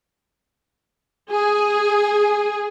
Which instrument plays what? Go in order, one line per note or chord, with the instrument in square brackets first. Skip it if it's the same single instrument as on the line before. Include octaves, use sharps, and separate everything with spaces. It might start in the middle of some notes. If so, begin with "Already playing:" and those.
[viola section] G#4